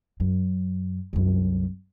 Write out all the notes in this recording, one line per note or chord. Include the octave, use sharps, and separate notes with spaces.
F#2
C2 F#2